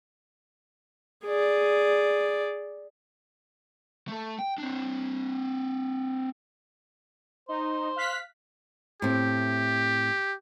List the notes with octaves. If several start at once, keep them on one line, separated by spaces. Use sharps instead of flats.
G#4 D5
A3 A4
G5
C4 D4
D#4 C5
F5 F#6 B6
A2 C4 G4